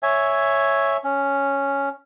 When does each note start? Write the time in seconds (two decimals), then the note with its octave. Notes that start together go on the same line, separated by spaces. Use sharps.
0.03 C#5 E5 G#5
1.04 C#4